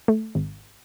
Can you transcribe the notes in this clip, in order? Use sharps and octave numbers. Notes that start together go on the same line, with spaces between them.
A3
G#1